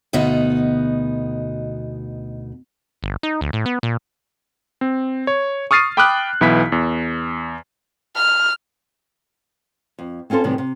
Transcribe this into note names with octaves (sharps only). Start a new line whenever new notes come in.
D2 B2 B3 D#4 D#5
G1
D#4
D2
A2
B3
A#2
C4
C#5
C#6 D#6 F6 A6 C7 D#7
G5 B5 D6 D#6 F6 F#6
B1 E3 B3 E4 B5 B6
E2
F6
F2
C4 C#4 F4 A4 C5
F#2 A2 C3 D#3 E3 G3
C3